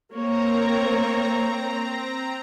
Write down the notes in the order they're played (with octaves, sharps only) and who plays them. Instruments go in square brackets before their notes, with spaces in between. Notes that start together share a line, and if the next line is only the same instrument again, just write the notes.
[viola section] A#3 A#4 C#5 [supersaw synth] C4 A#5